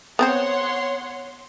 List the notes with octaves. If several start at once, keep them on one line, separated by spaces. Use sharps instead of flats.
B3 C4 C5 C#5 F#5 C6